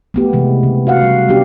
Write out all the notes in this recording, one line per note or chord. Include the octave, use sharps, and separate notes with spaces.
A3 B3 G4
C3 E3 G#3
C#3
F#4 F5 F#5
G3
B3 C#4 D4 G4